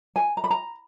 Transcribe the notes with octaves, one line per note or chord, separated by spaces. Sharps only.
G#5
A#5
B5
A#5